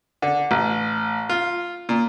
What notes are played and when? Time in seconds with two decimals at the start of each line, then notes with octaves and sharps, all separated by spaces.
0.22 D3
0.51 A1
1.29 F4
1.89 A#2